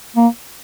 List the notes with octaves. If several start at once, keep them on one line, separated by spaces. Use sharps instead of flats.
A#3